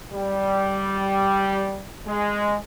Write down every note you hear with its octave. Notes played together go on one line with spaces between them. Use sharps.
G3
G#3